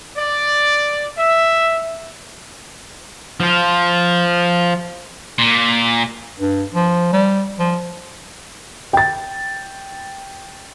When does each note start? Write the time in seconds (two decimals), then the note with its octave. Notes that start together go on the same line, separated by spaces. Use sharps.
0.16 D5
1.18 E5
3.40 F3 F4
5.38 A#2
6.40 G2
6.74 F3
7.13 G3
7.59 F3
8.93 G5 A6